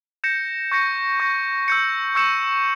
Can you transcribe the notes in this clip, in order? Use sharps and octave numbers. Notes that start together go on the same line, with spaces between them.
G6 A#6 C#7 E7
C#6 G6 A#6 C#7
C#6 G6 A#6
E6 G6 C#7
C#6 E6 G6 C#7 E7